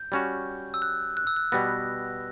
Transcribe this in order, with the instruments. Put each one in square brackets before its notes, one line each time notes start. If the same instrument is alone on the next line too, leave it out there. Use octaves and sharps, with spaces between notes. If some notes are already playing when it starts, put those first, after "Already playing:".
Already playing: [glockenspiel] G6
[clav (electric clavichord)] G3 C#4 F#4
[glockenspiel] E6
F#6
F#6
E6
F#6
[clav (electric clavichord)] B2 G3 B3 [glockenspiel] A#6